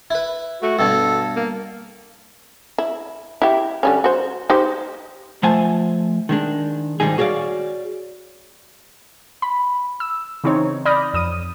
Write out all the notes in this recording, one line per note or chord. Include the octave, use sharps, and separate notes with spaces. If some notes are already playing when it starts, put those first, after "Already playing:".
E4 B4
A3 F#4
G2 B2 A4 A5
A#3
E4
E4 G4
D3 G3 C#4
F#4 C5
D#4 G4 C5
F3 A3 C5 F#5 G#5 A5
D#3 G#3 D4
G#2 D#3 G3 D#4 G#4
F#4 G#4 C#5 D5 F5
B5
E6
C#3 E3 C4 D#4 C#5
D5 B5 D#6 F6 G6 A#6
F2 D#6 D#7